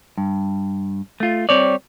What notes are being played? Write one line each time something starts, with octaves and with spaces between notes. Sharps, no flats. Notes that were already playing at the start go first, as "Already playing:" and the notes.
G2
A3 F4
G3 C4 C#5 D5